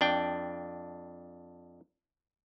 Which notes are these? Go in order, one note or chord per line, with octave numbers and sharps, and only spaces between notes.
F2 D4 G5